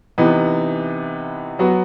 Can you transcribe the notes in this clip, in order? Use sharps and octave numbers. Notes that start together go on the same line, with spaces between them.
C3 E3 B3 D#4
F#3 B3 F#4